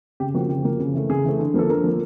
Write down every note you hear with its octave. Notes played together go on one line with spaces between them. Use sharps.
C#3 G4
F3 A#3 F#4
C#3 G4
F3 A#3
C#3
E3 A3
C#3 G#4
E3 A3
D3
F3 A#3 A4
D3 A#4
F3 A#3